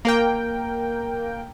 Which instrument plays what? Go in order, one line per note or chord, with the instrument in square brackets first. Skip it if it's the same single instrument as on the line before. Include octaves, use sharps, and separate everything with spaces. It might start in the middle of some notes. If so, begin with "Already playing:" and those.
[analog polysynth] A#3 A#4 G5